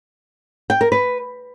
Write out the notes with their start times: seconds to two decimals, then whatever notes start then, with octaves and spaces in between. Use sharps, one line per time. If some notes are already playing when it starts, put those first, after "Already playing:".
0.70 G5
0.81 A#4
0.92 B4